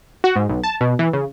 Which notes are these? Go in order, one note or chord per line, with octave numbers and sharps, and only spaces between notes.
F#4
G#2
B1
A5
B2
E3
C#3